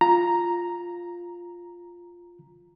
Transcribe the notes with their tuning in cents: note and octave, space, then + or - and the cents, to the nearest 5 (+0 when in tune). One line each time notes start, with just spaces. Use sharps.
F4 +0 A#5 +0